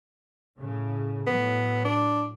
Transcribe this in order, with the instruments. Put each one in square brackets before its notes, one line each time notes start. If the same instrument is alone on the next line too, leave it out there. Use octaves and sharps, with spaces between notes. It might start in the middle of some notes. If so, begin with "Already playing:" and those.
[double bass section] A2 C#3
[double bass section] A2 F#3 [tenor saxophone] B3
[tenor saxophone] D4